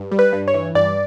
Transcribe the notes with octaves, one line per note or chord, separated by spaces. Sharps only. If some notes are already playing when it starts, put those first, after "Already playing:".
Already playing: G2
G3
B4
G2
C#5
E3
G2 D5